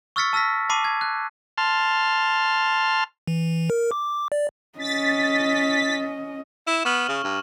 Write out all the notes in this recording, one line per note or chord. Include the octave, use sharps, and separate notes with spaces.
C#6 E6 F6 A6 B6 C#7
A5 E6 F6 A#6 B6
A5 B5 D6 C7 D#7
G#6
F#6
A5 C6 F6
E3
A#4
D6
D5
C#4 D#5 A6 B6
E4 E7
B3 C#6 F6 F#7
C#3
G2